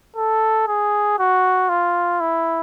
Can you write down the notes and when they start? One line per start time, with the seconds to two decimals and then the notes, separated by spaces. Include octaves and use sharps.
0.16 A4
0.67 G#4
1.19 F#4
1.69 F4
2.20 E4